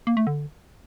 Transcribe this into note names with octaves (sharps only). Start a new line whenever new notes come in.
A#3
A3
D3